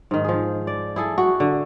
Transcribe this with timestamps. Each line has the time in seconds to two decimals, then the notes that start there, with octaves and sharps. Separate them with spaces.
0.11 G#2 D#3
0.24 F3 G#4
0.67 D5
0.96 E4 G#4 A4
1.18 F#4
1.40 D3